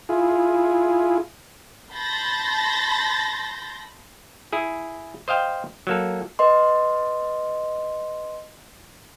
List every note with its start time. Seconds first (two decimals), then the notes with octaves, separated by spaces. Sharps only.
0.09 E4 F4 G#4
1.94 A5 B5 C6 G6 A6 A#6
4.53 E4 G#4
5.28 C5 D#5 F5 G5
5.87 F#3 A#3 A4
6.39 B4 D#5 C6